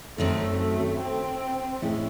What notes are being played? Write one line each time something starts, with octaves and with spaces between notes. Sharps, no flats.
F#2 D#3 F#3 A3 C4
A3
C4
A2 G#3 C#4 E4